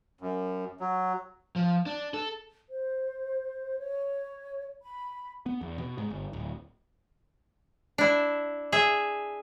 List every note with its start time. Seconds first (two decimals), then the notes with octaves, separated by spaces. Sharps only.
0.21 F#2
0.80 F#3
1.56 F3
1.86 D4
2.14 A4
2.68 C5
3.78 C#5
4.82 B5
5.46 B3
5.61 E2
5.78 B2
5.98 G#2
6.10 G1
6.33 D1
7.98 D4 E4
8.72 G#4 E5